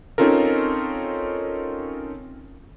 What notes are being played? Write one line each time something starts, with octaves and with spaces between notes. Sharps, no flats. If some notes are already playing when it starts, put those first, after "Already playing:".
C4 C#4 D#4 F4 A4 A#4